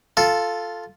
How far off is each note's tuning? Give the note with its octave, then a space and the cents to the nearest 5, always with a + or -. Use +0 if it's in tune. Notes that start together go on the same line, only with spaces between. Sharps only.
F4 +0 A4 +0